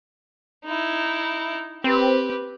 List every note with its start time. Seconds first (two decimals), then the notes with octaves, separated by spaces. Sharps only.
0.66 D#4 E4
1.84 C4 G4 B4